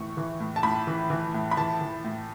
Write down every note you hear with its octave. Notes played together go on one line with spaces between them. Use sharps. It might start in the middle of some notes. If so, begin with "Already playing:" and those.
Already playing: A2 E3 C#6
E3
A2
A5
A2 B5
E3
E3
A2
B5
E3 A5
E3
A2